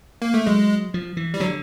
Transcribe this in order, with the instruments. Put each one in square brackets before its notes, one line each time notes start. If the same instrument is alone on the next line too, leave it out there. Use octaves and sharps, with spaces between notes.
[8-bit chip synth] A#3
A3
[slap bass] F#3 [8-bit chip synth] G#3
[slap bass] F3
E3
[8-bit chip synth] G3
[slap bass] D3 [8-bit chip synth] F#3